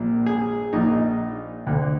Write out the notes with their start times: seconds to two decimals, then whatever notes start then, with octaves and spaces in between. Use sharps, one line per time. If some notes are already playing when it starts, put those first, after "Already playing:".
Already playing: A#1 A#2
0.26 G#4
0.73 A#1 A#2 D#4
1.67 D2 D3